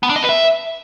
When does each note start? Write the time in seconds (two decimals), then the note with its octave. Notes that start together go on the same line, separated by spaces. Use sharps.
0.03 B3
0.09 D4
0.16 D#5
0.22 B4
0.29 E5